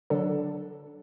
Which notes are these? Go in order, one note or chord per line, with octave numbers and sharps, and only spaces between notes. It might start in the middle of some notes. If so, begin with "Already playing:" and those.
D3 F#3 D4 A4